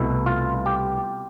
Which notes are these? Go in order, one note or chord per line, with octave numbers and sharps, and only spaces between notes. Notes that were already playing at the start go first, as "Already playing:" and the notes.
Already playing: C2 B2 A3 E4
F4
G4